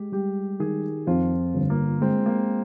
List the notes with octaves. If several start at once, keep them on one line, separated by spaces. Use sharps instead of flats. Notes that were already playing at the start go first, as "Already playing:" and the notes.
Already playing: G#3 G4
G3 G4
D#3 G#4
F2 F4
G1
A#3
G#3 C4
A#3